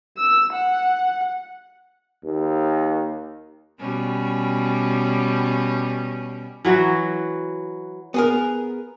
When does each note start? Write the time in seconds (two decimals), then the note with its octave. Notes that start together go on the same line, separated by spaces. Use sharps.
0.18 E6
0.54 F#5
2.24 D#2
3.80 B2 G3 C#4
6.65 E3 F#3 F#4
8.14 B3 G#4 A#4